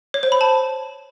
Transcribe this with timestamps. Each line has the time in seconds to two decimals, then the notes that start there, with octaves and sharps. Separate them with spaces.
0.14 C#5
0.23 C5
0.32 B5
0.41 A5